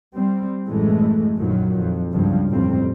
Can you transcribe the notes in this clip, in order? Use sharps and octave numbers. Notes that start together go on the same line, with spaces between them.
G3 C4
A1 F#2 E3 G#3 A3
A#1 F#2 D#3 F3 F#3
F2
C#2 G2 F3 F#3
A1 F2 G3 C4